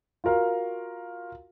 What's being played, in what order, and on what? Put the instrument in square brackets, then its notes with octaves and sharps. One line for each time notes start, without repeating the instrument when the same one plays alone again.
[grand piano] F4 F#4 A#4 F5